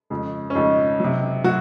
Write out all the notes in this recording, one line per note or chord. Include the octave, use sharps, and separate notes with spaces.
F2 C#3 G#3
C#4
F2 C#3 G#3 D#4
C3 F#3
F#3 F#4